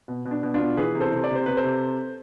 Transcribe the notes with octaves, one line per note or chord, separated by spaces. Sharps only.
B2
B2
D4
B2
D4 F4
B2
E3 G#4 B4
C3
A4 C5
C3
D5
C3
C5
C3 B4
A4 C5
C3